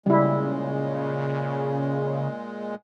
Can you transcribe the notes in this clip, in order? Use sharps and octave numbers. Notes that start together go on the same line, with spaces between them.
A#2 C#3 G3 G#3 E4